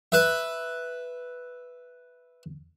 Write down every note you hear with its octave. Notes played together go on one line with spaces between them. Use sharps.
B4 E5